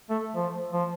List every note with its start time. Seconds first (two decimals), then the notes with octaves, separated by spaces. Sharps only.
0.10 A3
0.35 F3
0.72 F3